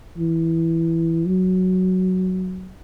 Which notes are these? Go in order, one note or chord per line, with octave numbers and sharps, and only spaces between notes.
E3
F#3